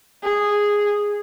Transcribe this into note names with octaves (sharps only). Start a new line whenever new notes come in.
G#4